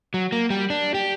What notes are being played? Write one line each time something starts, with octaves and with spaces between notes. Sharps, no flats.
F#3
A#3
G3
D4
G4